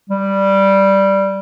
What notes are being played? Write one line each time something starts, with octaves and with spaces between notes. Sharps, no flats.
G3